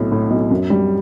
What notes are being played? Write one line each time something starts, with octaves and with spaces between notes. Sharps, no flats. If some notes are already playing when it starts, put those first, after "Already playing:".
Already playing: B1 A2
A2
B1
F#2
G3